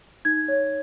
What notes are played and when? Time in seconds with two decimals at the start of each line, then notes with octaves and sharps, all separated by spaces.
0.25 D#4 G#6
0.48 C#5